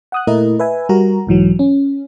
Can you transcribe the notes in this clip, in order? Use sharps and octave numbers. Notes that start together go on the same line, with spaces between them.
F#5 D#6 F#6
A#2 A3 E4 A#4 D#5
B4 E5 G#5
G3 F#4 A#4 A#5
B1 G#2 E3 F#3
C#4